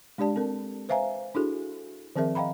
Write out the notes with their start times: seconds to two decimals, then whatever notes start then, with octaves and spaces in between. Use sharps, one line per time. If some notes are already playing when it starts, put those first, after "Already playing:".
0.18 G#3 D4 G4 D5 A5
0.36 C4 A4 A#4
0.89 B4 C5 E5 F5 G#5 A#5
1.35 D4 E4 F#4 G#4 A4
2.16 D#3 F3 C4 G#4 A#4 E5
2.35 D#5 F5 G5 A#5 B5